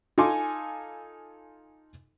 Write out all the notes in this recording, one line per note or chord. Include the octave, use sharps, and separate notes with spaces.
D#4 F4 A4 G#5 C6 D6